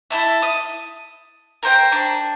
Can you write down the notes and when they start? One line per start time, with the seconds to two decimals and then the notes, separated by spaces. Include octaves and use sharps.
0.10 E4 A4 E5
0.42 D#6
1.63 A#4 C5 G5
1.92 D4